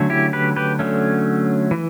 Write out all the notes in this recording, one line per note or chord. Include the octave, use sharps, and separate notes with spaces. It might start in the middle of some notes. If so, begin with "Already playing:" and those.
Already playing: D3 F#3 A3 C#4
E4 G4
G4 B4
G4 B4
D3 F#3 A3 C#4
E3